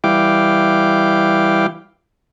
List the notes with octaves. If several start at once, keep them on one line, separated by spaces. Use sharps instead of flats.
E3 G3 E4 F5 G5 D6